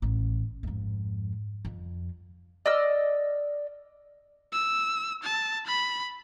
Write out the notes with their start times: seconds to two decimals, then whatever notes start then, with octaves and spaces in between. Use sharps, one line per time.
0.02 A1
0.63 F2 G#2
1.65 F2
2.66 D5 D#5 E6 F6
4.53 E6
5.23 A5
5.67 B5